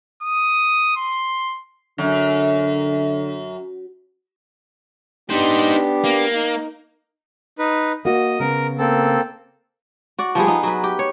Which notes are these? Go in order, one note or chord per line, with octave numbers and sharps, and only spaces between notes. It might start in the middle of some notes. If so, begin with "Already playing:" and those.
D#6
C6
F#2 D3
B3 D4 D#4 G4 C5
A#3
D#4
D#4 B4
A#3 F#4 D#5
C#3 B3 A#4
A#3 C4 A4
F#4 D5
F3 G3 B3 G#4
B3 D#4
F#3 B4
G4
C#5